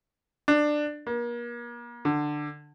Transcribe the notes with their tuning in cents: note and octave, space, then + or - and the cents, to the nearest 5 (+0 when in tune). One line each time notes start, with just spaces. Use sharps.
D4 +15
A#3 +40
D3 +15